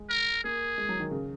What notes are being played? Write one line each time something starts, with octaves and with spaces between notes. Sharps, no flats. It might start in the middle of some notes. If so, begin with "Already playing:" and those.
Already playing: G#3
A#4
A#3 G#4
G#3
F#3
D#3
C#3